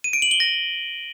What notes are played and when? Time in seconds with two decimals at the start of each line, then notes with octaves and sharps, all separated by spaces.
0.04 D#7
0.13 D7
0.22 F#7
0.31 G7
0.40 A#6